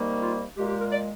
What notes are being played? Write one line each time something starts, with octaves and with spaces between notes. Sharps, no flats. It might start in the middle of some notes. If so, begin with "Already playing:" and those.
Already playing: C3 D#3 G3 A#3
F4
A#2 G#3 G4
G4
A#4
D5